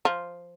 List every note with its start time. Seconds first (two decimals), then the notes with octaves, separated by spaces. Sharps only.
0.05 F3